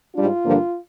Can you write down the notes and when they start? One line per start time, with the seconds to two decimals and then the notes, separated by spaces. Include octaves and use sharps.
0.15 G#2 G3 D4 F4
0.44 G2 D3 F3 A#3 D4